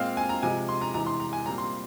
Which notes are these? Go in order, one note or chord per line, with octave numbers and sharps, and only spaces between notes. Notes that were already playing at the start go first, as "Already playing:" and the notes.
Already playing: A#2 G#3 C4 F5
G#5
A#5
C3 F3 G#3 G#5
C6
A#5
E2 C3 E3 G#3 A#5
C6
A#5
G#5
A#2 G3 C4 A#5
C6